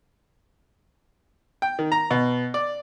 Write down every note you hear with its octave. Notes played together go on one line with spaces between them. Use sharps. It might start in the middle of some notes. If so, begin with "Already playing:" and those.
G5
D#3
A#5
B2
D5